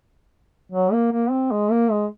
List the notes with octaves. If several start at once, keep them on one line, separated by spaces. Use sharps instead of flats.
F#3
A#3
A#3
C4
G#3
A#3
G#3